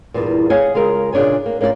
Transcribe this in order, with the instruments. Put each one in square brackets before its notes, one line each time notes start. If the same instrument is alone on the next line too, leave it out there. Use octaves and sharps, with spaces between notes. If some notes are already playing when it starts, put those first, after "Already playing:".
[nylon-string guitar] E2 G2 A#2
G#4 C#5 D#5 F5 F#5 G#5
C#3 G#3 F4 A#4
A#2 C#3 D4 C#5 G#5
A#3
A#3 C#4 F4 C5 D5